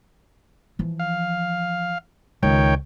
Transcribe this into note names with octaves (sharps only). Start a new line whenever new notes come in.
E3 F3
F5
C#2 D#3 C#5 G5